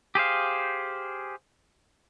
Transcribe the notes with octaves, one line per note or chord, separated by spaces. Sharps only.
G4 G#4 C5 F5